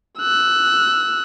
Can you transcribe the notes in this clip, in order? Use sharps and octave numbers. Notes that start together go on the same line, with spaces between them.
E6 F#6